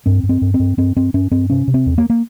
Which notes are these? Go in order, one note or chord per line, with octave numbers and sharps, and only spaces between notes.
G2 C4
G2
C4
G2
C4
G2
G2 C4
G2 C4
G2 C#4
G2 C4
C3 C#4
C3
C4
E2
A#3
A#3